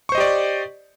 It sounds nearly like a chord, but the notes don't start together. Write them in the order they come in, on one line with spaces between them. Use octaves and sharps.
C#6 C5 D#5 G4 D5